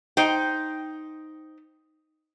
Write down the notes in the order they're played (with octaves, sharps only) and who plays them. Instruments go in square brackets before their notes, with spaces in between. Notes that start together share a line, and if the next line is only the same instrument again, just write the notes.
[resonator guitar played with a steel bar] D#4 C5 G5